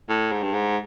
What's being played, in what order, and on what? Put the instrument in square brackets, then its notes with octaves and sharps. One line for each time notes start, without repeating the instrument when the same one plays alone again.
[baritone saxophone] A2
G#2
G2
G#2